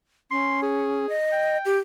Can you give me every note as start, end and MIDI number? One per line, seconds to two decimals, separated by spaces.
0.31 1.09 61
0.31 0.58 84
0.62 1.12 68
1.09 1.57 75
1.32 1.74 79
1.65 1.77 67